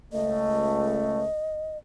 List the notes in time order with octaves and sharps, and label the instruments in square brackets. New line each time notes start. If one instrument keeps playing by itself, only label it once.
[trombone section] C#2 A3 [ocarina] D#5